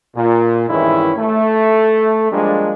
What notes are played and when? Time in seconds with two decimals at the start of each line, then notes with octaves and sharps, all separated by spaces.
0.16 A#2
0.70 G2 D#3 E3 G#3 C#4 E4
1.18 A3
2.32 F3 G3 G#3 A#3 D4